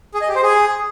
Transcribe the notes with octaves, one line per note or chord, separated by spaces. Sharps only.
G#4
D#5
G4
C5
G#4